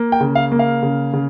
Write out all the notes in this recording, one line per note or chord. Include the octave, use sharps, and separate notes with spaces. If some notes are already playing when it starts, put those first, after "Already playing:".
Already playing: A#3
G5
C#3
F5
A#3
F5
C#3
C#3